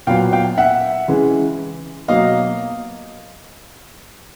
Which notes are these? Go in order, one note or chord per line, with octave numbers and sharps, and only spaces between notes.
A#2 F#3 B3 F5 G5
F5 G5
E5 F#5
C#3 E3 G#3
B2 F#3 A#3 D#5 F5